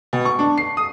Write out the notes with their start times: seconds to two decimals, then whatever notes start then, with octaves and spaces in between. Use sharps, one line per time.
0.13 B2
0.25 C#6
0.39 D4
0.58 C7
0.77 D#6